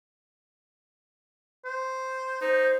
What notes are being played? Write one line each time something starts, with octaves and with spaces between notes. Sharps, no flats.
C5
D#4 C5